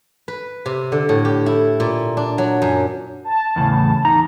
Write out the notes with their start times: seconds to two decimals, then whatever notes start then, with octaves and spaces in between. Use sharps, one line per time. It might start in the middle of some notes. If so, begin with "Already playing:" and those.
0.28 B4
0.66 C3
0.92 D3
1.09 A2
1.25 G4
1.46 E4
1.80 A#2
2.17 D4
2.38 F#3
2.62 F#2
3.24 A5
3.56 E2 A2 C#3
4.04 E2 D#4 A#5